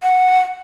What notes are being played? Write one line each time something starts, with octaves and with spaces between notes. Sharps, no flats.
F#5